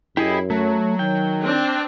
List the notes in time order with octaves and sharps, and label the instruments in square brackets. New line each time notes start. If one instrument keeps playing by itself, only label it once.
[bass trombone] F#2 [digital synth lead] E4 [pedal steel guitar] G4 G#4 D#5
[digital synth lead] F#3 [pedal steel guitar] A3
[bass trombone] D#3 [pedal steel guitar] G5
[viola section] C4 D4